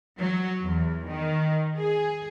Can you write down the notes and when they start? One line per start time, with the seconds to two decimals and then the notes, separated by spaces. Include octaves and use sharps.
0.20 F#3
0.64 E2
1.10 D#3
1.78 G#4